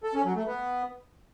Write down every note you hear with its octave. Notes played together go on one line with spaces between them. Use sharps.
A4
C#4
F#3
A3
B3